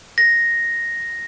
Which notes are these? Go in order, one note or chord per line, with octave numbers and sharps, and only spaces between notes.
A#6